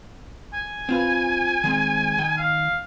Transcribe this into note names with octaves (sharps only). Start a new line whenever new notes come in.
G#5
C4 F4 B4
D#3 G#3 C4
D#3 G5
F5